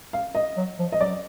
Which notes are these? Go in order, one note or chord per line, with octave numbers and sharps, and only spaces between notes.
F5
D#5
F#3
F3
D#5
F#3 D5